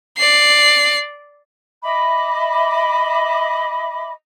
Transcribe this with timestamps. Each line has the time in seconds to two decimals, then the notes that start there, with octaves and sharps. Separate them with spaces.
0.18 D5 C7
1.83 D#5 E5 B5 D6